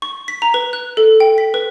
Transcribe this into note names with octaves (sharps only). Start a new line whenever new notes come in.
C#6
B6
A#5
B4
F#6
A4
G5
B6
B4